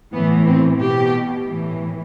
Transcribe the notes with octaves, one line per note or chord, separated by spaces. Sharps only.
A2 E3 B3
C4
B2 G4
A2 E3